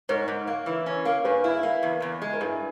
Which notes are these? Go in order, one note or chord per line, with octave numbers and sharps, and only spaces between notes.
G#2 A#4 C#5
G#2
A#3
E3
C#4
A#3
G2 G#4 B4
E4
A#3
E2
E2
G#3
A#4
G2 E4 G#4